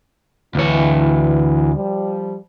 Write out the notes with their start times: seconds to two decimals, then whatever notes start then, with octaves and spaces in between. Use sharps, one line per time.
0.55 D2 E3 C#5
1.75 F3 G3